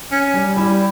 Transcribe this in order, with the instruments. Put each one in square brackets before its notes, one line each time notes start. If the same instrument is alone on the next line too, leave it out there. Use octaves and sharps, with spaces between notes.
[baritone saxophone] C#4
[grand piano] G3
[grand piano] G3 [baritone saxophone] E4